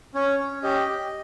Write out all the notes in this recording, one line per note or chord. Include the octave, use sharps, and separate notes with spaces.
C#4 C#5
C#4
G4 D#5
G4